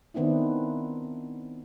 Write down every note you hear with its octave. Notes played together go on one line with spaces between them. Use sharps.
D#3 B3 C4 D4 E4